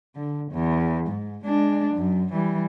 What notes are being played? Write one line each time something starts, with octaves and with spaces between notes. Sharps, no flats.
D3
E2
G#2
G#3 D4
F#2
E3 G3